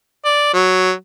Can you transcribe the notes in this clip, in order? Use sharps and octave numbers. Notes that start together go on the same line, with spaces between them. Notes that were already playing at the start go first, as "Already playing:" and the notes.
D5
F#3